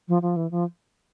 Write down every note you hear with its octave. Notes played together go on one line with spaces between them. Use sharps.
F3
F3
E3
F3